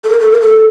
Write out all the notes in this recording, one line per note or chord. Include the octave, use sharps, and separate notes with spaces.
A4
A#4
A4
A#4
A4